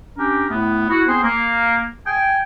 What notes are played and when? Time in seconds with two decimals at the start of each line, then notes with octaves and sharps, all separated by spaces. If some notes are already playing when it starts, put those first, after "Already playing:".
0.17 C#4 D4 G4 A#4
0.50 A2 A3 B3
0.88 E4 F#4
1.06 B3 C4 G#4 C5
1.23 A#3
2.06 G5 G#5